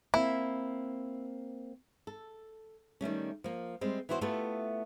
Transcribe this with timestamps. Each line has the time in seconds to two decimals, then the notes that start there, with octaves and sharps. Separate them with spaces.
0.14 A#3 C4 E4
2.07 A4
3.01 D#3 G3 A3 C#4
3.44 F3 A#3
3.81 G3 G#3 C4
4.09 E3 B3 E4 F#4 C5
4.21 A3 B3 E4 F4 G4 A4